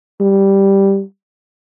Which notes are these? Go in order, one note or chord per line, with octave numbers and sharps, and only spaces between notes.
G3